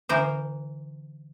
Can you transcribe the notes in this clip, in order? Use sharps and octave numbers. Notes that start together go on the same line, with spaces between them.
D3 E3 A#4 C5